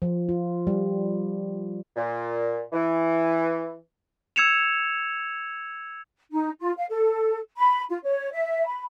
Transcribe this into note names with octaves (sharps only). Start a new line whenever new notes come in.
F3
F4
G3
A#2
E3
E6 G#6 C#7 E7 F7
D#4
F4
F5
A4
B5
F4
C#5
E5
B5